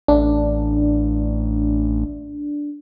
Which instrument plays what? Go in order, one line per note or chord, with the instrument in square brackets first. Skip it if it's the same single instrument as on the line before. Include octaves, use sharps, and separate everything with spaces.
[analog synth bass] A1 [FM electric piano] D4